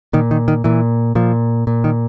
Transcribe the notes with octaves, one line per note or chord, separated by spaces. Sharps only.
A#2 D#3
D#3
D#3
A#2 E3
A#2 F3
A#2
D#3